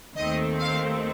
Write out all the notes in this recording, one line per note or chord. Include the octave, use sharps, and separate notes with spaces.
D#2 D#3 A3 C4 D#5
F5